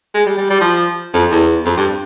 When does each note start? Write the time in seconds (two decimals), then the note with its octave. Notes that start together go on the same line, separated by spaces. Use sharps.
0.14 G#3
0.26 G3
0.38 G3
0.50 G3
0.61 F3
1.14 F2
1.31 E2
1.66 F2
1.77 G2